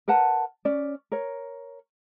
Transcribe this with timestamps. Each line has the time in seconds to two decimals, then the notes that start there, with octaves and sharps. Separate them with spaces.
0.08 A#4 B4 F#5 A5
0.65 C#4 D5
1.12 A#4 C#5